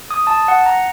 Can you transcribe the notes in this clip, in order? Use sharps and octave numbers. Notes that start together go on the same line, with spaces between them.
D#6
A5
F#5
A#5